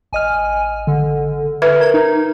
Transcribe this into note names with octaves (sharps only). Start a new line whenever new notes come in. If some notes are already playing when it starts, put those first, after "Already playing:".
A1 D#5 G#5 F6
D3
B4 E5 F6
A#4 G#6
D#4